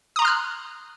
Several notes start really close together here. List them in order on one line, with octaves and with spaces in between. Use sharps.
D#6 A#5 C6 F6 F#6